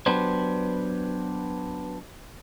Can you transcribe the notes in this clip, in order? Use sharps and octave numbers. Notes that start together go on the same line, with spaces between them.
F#3 B3 D4 G4 B4 C5